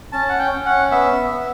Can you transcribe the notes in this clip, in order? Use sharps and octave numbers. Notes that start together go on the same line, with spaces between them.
C#4 A5
F#5
G5
C#4
F#5
B3 E5
B3